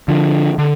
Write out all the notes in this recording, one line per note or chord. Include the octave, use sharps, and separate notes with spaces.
D3 F3 D4
D3